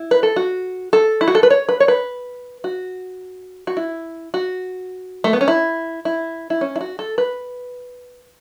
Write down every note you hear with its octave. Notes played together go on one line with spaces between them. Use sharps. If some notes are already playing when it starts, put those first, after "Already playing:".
Already playing: E4
B4
A4
F#4
A4
E4
F#4
A4
B4
C#5
B4
C#5
B4
F#4
F#4
E4
F#4
A3
B3
C#4
E4
E4
E4
C#4
E4
F#4
A4
B4